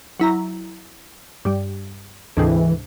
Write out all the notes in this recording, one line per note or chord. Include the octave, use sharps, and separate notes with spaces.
F#3 E4 A#5
G2 G3
D2 G#2 C3 E3